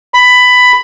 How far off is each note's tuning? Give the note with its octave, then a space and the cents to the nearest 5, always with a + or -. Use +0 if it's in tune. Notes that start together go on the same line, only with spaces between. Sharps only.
B5 +10